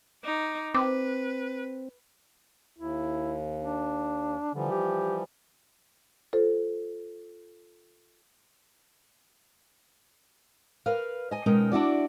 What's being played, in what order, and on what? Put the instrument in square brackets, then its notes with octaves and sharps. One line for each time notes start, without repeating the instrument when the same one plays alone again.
[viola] D#4 D6
[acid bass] C4 [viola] B4 [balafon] D6
[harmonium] D#2 [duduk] E4
[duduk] D4
[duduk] D3 [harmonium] E3 F3 G3
[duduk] G4
[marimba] F4 A4 C5
[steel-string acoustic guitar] A#4 B4 F5
D#5 G#5
B2 G#3 C#4 D#4 A#4 G5
D4 E4 F#4 D5